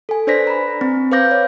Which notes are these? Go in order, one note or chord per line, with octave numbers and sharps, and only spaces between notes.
A4 G#5
D4 B4 C5 D5 A#6 B6
A#5 B5
C4
B4 C5 F5 D6 G6 A#6
C#5